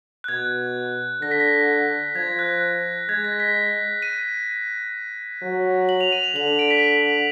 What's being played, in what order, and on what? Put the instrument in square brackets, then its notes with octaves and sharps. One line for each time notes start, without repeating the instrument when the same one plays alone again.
[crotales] F#6
[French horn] B2 [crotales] G#6
[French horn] D3 [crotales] A#6
[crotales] B6
A#6
[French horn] F3 [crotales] G#6
[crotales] F#6
[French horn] G#3 [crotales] G#6
[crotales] A#6
B6
D#7
[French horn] F#3
[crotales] F#7
F7
D#7
F7
[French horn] D3 [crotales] F#7
[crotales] F7
D7
B6